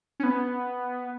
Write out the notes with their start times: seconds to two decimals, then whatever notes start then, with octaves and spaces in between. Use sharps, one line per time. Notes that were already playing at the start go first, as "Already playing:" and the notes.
0.20 C#4
0.23 B3